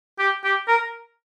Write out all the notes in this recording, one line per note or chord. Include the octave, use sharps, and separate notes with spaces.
G4
G4
A#4